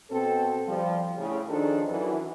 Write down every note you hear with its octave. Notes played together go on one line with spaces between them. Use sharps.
B2 C4 A4
F3 G3
A2 C#3
D#3 F3 D4 D#4 G#4 A4
F#2 E3